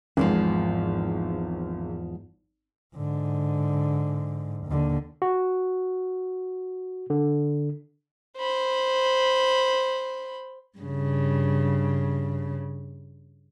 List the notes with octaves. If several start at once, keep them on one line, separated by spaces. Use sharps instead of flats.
G#1 E2 G#2 F3
G#2 D3
D#2 D3
F#4
D3
C5 B5
G2 C#3